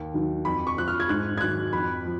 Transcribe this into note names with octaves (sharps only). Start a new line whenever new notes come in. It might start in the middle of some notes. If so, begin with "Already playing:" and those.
Already playing: D#2
D#3 F#3
F2 B5
C#6
F3 F#6
F6
G#6
G#2 F#6
G#6
D#3 F#3 F#6
F2 B5
F3